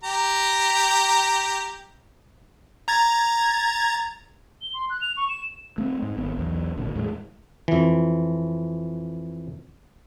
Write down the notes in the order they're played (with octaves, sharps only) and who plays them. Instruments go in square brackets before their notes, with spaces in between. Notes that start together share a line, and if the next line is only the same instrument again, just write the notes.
[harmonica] G4 A#5
[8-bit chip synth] A#5 G#6 A6
[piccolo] G7
C6
F#6
F7
C#6
E7
[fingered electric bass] A3 C4
G#2
G#1 B3
B1 E2 B2
G#1 A#2 D3
E2 A2 F#3 G#3
[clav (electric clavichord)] F2 E3